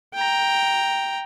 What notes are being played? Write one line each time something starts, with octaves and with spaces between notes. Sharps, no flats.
G5 A#5